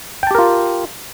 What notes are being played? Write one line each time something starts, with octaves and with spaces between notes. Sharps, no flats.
F4 G4 A#4 G5 A5